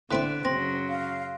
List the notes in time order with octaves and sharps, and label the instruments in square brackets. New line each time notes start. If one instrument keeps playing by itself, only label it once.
[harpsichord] A2 C4 E4 [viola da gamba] D3 [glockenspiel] F#6 B6 D7
[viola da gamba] F#2 C#3 F#3 [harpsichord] C4 [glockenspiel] C6 A#6
[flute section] F5